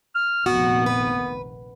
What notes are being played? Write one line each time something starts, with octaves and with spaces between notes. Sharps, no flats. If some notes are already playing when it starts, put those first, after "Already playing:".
F6
F1 A#1 D#3 B3 F#4
B4